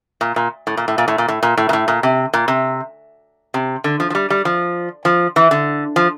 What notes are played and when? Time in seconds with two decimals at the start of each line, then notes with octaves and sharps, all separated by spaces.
0.21 A#2
0.36 A#2
0.67 A2
0.77 A#2
0.88 A2
0.98 A#2
1.08 A2
1.18 A#2
1.28 A2
1.43 A#2
1.57 A2
1.69 A#2
1.73 A2
1.88 A#2
2.03 C3
2.34 A#2
2.48 C3
3.54 C3
3.84 D3
4.00 F3
4.10 F3
4.15 G3
4.30 G3
4.45 F3
5.05 F3
5.36 E3
5.51 D3
5.96 F3